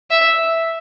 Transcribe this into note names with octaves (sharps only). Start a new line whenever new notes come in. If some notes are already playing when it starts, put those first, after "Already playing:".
E5